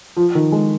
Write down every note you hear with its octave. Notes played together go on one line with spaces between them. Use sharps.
F3
D#3
G#3